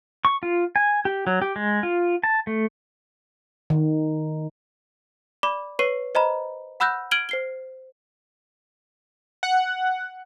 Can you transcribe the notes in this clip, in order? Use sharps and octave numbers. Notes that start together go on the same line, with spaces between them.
C#6
F4
G#5
G4
F#3
G4
G#3
F4
A5
A3
D#3
D5 B5 D6
B4 C#5 C#6 C7 D#7
C5 D#5 A#5 B5
F#5 B5 E6 F#6 G6 A#6
F6 G#6 D7 D#7 F#7 G7
C5 C7 G7
F#5